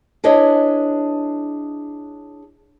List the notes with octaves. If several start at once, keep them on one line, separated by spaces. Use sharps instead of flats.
D4 E4 G#4 B4 C#5 D#5